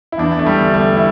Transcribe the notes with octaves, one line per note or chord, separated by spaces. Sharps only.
E4
E2 D4
A3
G3
D3
A3
E4